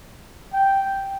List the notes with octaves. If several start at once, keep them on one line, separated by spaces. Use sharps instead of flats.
G5